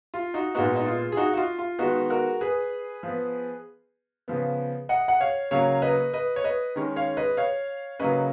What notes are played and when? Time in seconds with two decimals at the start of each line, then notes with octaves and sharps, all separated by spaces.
0.14 F4
0.34 D#4 F#4
0.55 A#2 G#3 B3 D#4 F#4
0.76 D#4
0.86 F4
1.12 G#4
1.17 D#4 F#4
1.33 F#4
1.37 F4
1.59 F4
1.79 D#3 G#3 B3 D#4 F#4
2.10 F#4 A#4
2.41 G#4 B4
3.03 F3 B3
4.28 C#3 F3 B3
4.89 D#5 F#5
5.08 F#5
5.21 C#5 F5
5.51 C#3 F#3 A#3 C#4 C#5 F5
5.82 B4 D#5
6.13 B4 D#5
6.36 C#5
6.44 B4 D#5
6.76 D#3 G#3 C#4
6.96 C#5 F5
7.17 B4 D#5
7.37 C#5 F5
8.00 C#3 F#3 A#3 C#4 B4 D#5